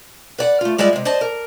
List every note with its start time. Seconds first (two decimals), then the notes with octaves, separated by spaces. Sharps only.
0.38 B4 D5 F#5
0.61 A3 F4
0.78 G3 G#3 F4 B4 D5 E5
0.93 C3 G#3
1.05 C5 D5 D#5 A5
1.21 A#4